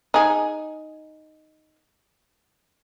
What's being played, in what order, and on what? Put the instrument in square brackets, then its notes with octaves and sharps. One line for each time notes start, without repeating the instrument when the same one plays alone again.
[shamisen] D#4 G#4